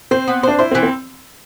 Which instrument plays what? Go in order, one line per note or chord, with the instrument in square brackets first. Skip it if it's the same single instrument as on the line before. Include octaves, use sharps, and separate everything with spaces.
[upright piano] C4 [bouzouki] C5
[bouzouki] B3
[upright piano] D4 [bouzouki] C5
[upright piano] E4 [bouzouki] C5
[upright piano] C4
[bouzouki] E3
[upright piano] C4